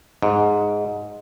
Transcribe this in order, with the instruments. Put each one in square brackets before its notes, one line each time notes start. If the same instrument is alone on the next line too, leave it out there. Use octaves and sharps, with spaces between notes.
[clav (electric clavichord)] G#2